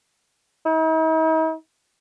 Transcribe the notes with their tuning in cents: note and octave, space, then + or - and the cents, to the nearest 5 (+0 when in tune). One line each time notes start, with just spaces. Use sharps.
D#4 +45